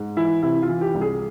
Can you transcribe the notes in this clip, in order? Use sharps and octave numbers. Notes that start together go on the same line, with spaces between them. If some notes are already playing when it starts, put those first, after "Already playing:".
Already playing: G#2
E3 E4
C3 E4
F4
E3
G4
C2
G#4